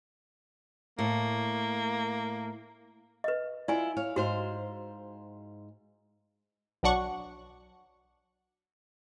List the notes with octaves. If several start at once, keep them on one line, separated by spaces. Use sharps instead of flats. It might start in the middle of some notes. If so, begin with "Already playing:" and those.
A2 A#3
B4 D#5
E4 F4 D5 E5 G#5
C#5 F5
G#2 F#4 C5 F5
B1 F#3 D4 F#5 C#6